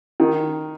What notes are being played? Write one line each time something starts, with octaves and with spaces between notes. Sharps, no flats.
D#3